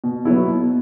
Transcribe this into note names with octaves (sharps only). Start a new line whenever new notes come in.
B2
F#3 B3 E4
B2